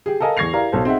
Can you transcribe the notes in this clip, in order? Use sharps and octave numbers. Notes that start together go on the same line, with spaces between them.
G4 G#4
A4 A#4 D#5 F5 G#5
E2 C#6 G#6 A#6 C7 F7
E4 G4 A#4 D5 F5 A#5
B1 A4 C5
C4 D#4 G#4 E5 F#5